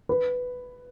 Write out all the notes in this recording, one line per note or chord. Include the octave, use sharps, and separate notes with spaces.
B4